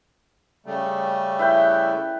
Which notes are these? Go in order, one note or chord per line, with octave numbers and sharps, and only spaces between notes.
C#3 G3 A3
E4 B4 G5